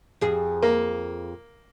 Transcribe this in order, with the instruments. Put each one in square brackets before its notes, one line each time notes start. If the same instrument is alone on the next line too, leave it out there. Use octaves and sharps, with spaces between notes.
[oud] F2 G#4
[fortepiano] A#3